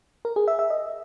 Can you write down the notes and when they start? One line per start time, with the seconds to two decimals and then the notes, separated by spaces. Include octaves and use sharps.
0.25 A#4
0.36 G#4
0.48 E5
0.59 E5
0.70 D#5